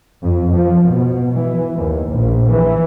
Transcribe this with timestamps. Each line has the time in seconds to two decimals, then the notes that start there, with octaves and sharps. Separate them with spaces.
0.23 F2
0.53 F3
0.87 B2
1.36 E3
1.75 D#2
2.11 A#1
2.49 E3